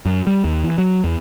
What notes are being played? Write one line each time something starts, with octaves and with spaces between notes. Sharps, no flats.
F#2
G3
D#2
E3
F#3
E2